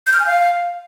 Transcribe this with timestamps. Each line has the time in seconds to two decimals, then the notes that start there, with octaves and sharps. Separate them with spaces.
0.07 G6
0.13 F6
0.20 G#5
0.26 F5